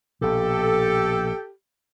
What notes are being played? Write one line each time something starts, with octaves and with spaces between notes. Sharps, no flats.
A#1 B2 G4 A4